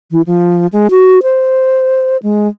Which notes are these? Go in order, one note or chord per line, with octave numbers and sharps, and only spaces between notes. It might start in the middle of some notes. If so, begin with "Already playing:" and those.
E3
F3
G#3
F#4
C5
G#3